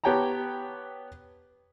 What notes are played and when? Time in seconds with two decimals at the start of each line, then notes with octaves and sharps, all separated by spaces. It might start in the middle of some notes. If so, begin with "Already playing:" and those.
0.04 B3 G4 C#5 G5 A5 A#5